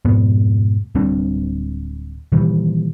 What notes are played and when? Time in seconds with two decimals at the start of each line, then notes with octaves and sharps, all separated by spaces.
0.05 F2 G#2 B2 B3
0.95 D1 G3 C4 D4
2.32 A#2 D#3 E3 G3